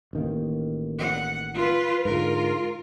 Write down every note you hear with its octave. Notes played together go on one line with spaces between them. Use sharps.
A1 D#3 A#3
F#5
F4 B4
G#2 D3 F4 A#4